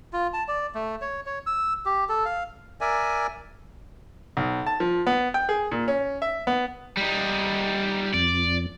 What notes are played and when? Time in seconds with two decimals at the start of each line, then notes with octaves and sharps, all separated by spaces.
0.13 F4
0.33 A5
0.48 D5
0.75 A3
1.01 C#5
1.26 C#5
1.47 E6
1.85 G4
2.09 A4
2.25 F5
2.81 A#4 D5 E5 G#5
4.37 B1
4.66 A5
4.80 F3
5.07 B3
5.34 G5
5.49 G#4
5.72 A#2
5.88 C#4
6.22 E5
6.47 B3
6.97 G3 D#4
8.14 F2 D5